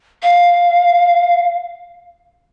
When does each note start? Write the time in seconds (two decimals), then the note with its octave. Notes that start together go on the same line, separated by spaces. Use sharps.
0.23 F5